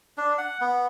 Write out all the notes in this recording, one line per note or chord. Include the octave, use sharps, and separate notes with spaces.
D4
F#5
B3